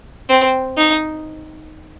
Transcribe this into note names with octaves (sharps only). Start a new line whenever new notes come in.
C4
D#4